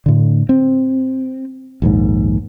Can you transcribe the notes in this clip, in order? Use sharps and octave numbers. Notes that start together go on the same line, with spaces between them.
A2 D3
C4
A#1 D#2 G#2